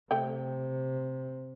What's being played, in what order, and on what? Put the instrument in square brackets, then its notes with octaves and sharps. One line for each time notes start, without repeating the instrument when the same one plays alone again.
[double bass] C3 [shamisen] A3 G5